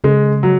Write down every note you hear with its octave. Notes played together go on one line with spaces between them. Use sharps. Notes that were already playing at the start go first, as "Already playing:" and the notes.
C#3 G#3
C#3 F#3